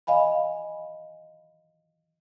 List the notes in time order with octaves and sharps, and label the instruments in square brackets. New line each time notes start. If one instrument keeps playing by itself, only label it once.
[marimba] D#5 F5 G#5 B5